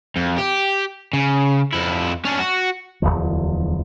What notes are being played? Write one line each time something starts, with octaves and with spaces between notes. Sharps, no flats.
F2
G4
C#3
F2 E4
C#4 D4
F#4
D1 G1 E2 F3